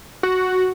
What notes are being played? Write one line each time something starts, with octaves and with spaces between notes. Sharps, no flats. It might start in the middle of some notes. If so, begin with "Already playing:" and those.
F#4